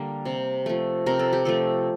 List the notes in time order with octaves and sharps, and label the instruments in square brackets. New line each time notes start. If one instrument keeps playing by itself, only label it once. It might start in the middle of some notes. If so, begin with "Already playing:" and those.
Already playing: [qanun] D3 G3 A#3
C3
F3 A3
C3 A#4
A4
G4
F3 A3 A4